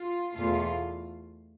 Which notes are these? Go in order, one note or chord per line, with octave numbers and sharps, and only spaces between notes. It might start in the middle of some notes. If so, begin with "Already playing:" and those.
Already playing: F4
E2 B2 A3 F4